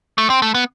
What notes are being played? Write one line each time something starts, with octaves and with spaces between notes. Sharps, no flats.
A3
C4
A3
B3